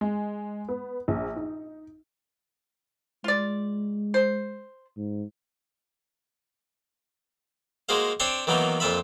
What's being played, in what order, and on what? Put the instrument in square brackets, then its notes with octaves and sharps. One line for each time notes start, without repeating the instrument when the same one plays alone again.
[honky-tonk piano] G#3
B3
A#1
D#4
[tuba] G#3 [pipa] F4 D5
[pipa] C5
[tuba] G#2
[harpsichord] G#3 A#3 F#4 G#4 C5 F5
C4 D4 C#5 C6 C#6
D#3 E3 F#3 A#3 B3 D#4
F2 A#2 F4 E5 B5